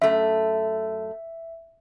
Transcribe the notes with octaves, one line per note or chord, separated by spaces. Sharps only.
F#2 A3 E5